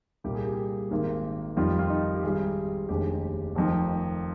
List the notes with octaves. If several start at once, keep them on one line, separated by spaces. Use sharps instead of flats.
C2 A#2 G3 A#3 G4
G#4
G4
G#1 G#2 D#3 A#3
F2 D#3 G3 F4
F4
D#4
G4
G#1 G#2 G3 G#4
F1 D#2 D3 G#3 G4
F1 F2 D#3